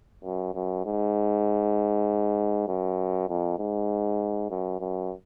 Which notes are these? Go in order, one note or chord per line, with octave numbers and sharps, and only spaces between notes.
F#2
F#2
G#2
F#2
F2
G#2
F#2
F#2